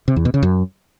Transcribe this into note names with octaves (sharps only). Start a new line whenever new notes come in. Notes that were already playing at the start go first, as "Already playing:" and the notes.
C3
E2
B2
C#3
F#2